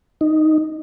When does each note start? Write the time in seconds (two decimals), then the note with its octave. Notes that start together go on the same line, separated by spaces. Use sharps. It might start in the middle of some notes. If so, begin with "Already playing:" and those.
0.21 D#4